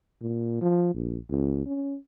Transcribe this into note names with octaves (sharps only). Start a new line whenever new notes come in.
A#2
F3
A#1
C#2
C#4